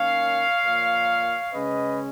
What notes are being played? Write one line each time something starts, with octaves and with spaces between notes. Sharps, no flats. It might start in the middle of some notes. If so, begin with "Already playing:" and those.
Already playing: D#3 A#3 C#4 C#5 F5
A#2 F3 A#3
C#3 G#3 C#4 B4 D#5